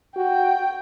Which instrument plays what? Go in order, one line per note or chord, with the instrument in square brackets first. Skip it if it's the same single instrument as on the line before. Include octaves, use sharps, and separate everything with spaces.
[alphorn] F#4 [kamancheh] G5